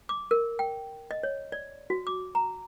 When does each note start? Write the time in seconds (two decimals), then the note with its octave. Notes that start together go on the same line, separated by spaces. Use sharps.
0.09 D6
0.31 A#4
0.59 G5
1.11 D#5
1.23 C#5
1.52 D5
1.90 F#4
2.07 D6
2.35 A#5